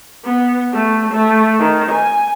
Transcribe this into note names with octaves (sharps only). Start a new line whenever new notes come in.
B3
A3
A3
D#3
G#5